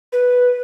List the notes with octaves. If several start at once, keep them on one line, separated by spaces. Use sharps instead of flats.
B4